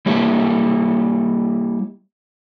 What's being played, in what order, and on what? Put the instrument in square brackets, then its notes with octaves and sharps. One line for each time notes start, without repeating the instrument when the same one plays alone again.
[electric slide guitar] G3 A#3 E4 G4 C#5 E5